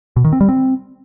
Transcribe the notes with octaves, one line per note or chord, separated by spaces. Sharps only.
B2
D#3
C4
G3
C4